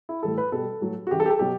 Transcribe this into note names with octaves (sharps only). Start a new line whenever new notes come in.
E4
A2 E3 G3 A4
B4
B2 G3 A4
A2 F#3
F#4
C#3 E3 G3 G4
A4
G4
A4
B2 F#3 G4